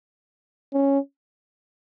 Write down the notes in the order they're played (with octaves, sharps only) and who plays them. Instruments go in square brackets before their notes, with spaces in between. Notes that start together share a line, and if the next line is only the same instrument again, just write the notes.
[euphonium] C#4